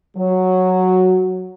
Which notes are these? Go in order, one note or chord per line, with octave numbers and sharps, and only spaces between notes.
F#3